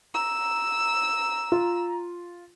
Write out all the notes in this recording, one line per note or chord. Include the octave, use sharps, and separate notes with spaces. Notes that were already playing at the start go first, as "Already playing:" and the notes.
A#5 E6
F4